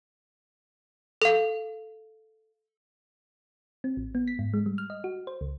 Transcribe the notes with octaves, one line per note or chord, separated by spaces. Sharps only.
A4 F5
C4
A1
B3
B6
G#2
G#3
G3
F6
D#5
F#4
C5
C#2